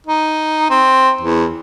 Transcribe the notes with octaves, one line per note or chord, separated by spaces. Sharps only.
D#4
C4
E2